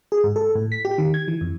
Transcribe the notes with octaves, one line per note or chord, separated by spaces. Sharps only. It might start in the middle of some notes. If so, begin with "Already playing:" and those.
G#4
G#2
A4
A2
B6
G4
D#3
G#6
E3
F2